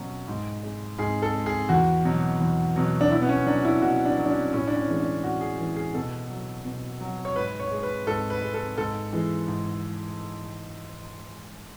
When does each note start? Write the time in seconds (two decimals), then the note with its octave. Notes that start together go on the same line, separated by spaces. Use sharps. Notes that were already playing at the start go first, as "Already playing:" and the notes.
Already playing: B2 F#3 C#4
0.28 G#2
0.63 G#3
0.99 G#2 G#4
1.22 A4
1.34 G#3
1.46 G#4
1.69 E2 F#4
2.04 B2 F#3
2.41 E2
2.76 B2 F#3
3.01 D4
3.11 B2 E4
3.22 B3
3.29 C#4
3.46 F#3 D4
3.65 E4
3.81 B2 F#4
4.05 D4
4.18 F#3
4.25 D4
4.30 C#4
4.53 A2 C#4
4.68 D4
4.76 C#4
4.88 E3 G#3
5.00 D4
5.23 A2 F#4
5.41 G#4
5.59 E3 G#3
5.76 G#4
5.94 B2 A4
6.30 F#3
6.65 B2
7.01 F#3
7.25 C#5
7.36 G#2 B4
7.60 C#5
7.71 G#3
7.83 B4
8.07 G#2 A4
8.30 B4
8.42 G#3
8.54 A4
8.78 G#2 A4
9.13 E3 G#3
9.48 G#2